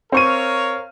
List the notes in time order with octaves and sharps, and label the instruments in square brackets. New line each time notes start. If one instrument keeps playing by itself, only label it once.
[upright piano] C4 C#6 D#7 [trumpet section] A#4 C#5 F5